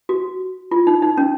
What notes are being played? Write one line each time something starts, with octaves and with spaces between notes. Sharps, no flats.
F#4
F4
D#4
D#4
C#4